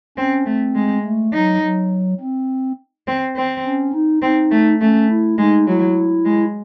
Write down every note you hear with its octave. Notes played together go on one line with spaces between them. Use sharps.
C4 C#4
A3 C4
G#3
A3
F#3 D#4
F#3
C4
C4
C4
C#4
D#4
C4 D#4
A3
A3 C#4
E4
G#3 D#4
F#3 E4
G#3